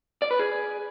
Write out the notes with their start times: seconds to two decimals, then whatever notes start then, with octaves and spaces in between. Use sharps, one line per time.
0.22 D5
0.31 B4
0.39 G#4